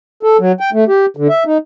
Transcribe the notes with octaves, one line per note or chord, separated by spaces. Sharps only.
A4
F#3
G5
A3
G4
D3
E5
D#4